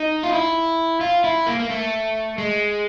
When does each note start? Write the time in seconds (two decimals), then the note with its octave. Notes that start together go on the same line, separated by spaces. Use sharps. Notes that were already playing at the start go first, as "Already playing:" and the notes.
Already playing: D#4
0.24 F4
0.32 E4
1.01 F4
1.24 E4
1.46 A#3
1.59 A#3
1.70 A3
2.38 G#3